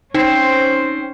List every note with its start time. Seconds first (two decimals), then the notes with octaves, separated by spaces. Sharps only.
0.14 C4 C#4 D#4 C5